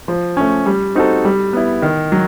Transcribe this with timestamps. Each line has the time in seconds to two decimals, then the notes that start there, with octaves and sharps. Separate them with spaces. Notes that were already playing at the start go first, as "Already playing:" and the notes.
0.08 F3
0.37 A3 C#4
0.66 G3
0.95 C4 D#4 F#4 A4
1.25 G3
1.53 B3 E4
1.82 D#3
2.12 F#3